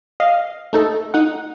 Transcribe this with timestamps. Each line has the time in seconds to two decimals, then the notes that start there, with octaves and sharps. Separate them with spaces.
0.20 D#5 F5
0.73 A3 D#4 A4
1.14 D#4 F#5